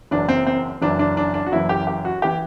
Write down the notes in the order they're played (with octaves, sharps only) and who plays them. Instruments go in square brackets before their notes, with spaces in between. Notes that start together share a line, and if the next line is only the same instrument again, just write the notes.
[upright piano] F#1 F#2 E3 D4
C4
C4
F#1 F#2 E3 D4
D4
D4
D4
F#4
F#1 F#2 E3 E4
G4
G4
F#4
E3 G4